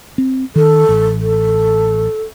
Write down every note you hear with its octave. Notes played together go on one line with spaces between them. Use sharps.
C4
D#3 A4
A1
A4